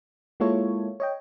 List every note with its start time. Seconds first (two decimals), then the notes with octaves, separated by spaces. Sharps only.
0.40 G#3 A#3 E4 F4 A4 C#5
1.00 C#5 D#5 G5